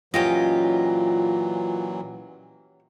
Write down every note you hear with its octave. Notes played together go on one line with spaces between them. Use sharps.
A#2 E3 F#3 C#4 F4 G4 D#5